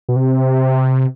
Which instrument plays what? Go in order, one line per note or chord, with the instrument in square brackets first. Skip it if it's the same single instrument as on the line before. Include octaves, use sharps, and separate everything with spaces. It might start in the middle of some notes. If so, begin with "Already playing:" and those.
[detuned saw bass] B2
C3